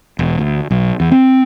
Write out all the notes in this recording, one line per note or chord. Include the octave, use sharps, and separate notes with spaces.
E1
D2
B1
E2
C4